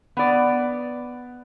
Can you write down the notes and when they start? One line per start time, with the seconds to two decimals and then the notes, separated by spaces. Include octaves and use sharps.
0.17 B3 D5